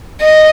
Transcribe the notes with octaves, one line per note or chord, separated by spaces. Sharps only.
D#5